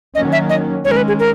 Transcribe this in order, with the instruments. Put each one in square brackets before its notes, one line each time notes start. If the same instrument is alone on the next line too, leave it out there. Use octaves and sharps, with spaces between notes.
[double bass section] D#3 F#3 A#3 C#4 [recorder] D#5
[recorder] E5
D#5
[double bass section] D#3 G#3 C#4 [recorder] C#5
[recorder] A#4
B4
G#4
A#4